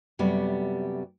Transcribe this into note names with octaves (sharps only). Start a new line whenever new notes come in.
F#2 C3 G3 A3 B3